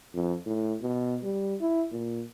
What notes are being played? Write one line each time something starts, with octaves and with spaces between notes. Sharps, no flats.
F2
A2
B2
G3
E4
A#2